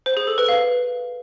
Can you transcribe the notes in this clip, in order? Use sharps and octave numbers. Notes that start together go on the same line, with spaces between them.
C5
G#4
A4
B4
F5